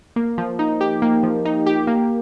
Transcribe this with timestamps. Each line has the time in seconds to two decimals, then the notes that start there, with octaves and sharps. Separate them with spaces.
0.16 A#3
0.38 F3
0.59 D#4
0.81 G4
1.02 A#3
1.23 F3
1.45 D#4
1.66 G4
1.87 A#3